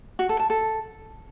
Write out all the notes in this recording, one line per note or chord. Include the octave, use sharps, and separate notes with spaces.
F#4
A4
A5
A4